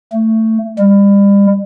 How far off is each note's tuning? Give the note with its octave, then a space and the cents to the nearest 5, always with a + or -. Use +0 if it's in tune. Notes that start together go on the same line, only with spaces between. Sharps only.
A3 +15
G3 +35